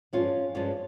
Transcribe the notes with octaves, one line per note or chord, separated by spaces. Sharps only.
G2 F3 G#3 C#4 F4
G2 F3 G#3 C#4 F4